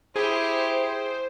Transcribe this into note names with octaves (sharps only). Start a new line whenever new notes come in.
E4 G4 G#4 C5